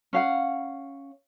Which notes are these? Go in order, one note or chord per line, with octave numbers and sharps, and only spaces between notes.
C#4 F5 F#5